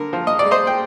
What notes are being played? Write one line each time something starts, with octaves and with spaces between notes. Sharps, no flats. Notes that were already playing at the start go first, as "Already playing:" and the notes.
Already playing: D3 A#4
F3
D#5
G#3 D5
C5 D#5
G5